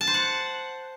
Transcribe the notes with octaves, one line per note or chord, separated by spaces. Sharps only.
A5
C5
F#5